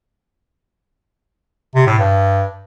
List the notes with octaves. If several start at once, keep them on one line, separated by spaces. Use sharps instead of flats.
C3
A2
G2